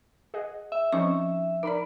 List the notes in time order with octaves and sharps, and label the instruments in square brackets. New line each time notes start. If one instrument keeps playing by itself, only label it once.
[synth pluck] G#4 D#5 F#5
[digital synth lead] E5
[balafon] F3 D#5 C#6 [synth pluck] C4 C#4 D#4
[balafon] D#4 D5 [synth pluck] A#4 A#5 B5